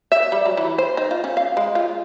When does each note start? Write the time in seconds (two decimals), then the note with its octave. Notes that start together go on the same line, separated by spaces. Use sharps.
0.12 E5
0.32 G3
0.45 F#3
0.57 E3
0.78 C5
0.97 D#4
1.11 F4
1.24 C#4
1.37 F5
1.57 G#3
1.75 F4